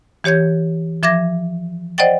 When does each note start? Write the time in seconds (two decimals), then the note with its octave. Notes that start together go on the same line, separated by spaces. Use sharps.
0.24 E3 G4 C#5 G6 G#6
1.03 F3 E5 D6 G#6 A#6
1.98 C5 D5 D#5 F#5 G5 A6